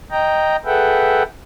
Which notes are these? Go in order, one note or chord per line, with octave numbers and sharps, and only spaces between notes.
D#5 G5 A#5
G#4 A4 B4 E5 F#5 G5